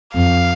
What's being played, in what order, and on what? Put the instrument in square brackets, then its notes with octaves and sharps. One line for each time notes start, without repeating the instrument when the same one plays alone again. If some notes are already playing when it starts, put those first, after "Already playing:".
[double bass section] F2 [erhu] F5